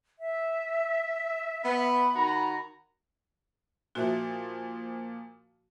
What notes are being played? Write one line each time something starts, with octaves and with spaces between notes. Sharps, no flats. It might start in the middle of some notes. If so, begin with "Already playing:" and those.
E5
B3 B5
D#3 F#4 A#5
A#2 F3 F#4 E5